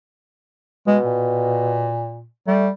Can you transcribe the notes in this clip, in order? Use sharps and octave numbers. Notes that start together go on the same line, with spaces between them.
B2 G#3
A#2
G3 A3